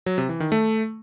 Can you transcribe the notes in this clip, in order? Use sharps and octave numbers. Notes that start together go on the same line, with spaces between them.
F#3
C3
E3
D#3
A3